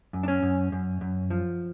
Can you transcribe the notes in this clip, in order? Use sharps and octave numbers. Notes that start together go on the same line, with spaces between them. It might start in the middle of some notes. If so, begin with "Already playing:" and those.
F#2
D4
C#4
F#2
F#2
F#2
F3